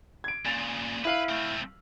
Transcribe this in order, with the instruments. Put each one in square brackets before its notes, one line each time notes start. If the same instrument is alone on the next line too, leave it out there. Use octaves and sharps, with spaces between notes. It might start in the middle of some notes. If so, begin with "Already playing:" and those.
[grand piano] G#6 D7
[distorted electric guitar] A#2 C#3 [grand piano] A6 F7
[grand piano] E4 F5 F#7 [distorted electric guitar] B4
[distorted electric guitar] A3 C4